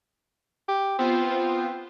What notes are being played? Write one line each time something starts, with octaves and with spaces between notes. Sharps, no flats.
G4
B3 C4 F4 C5